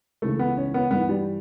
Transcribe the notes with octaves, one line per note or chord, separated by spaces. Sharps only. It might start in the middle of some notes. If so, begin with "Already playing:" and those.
C#2 C#3 E3 A3
B3
C#4
B3
G2 E3 B3
G3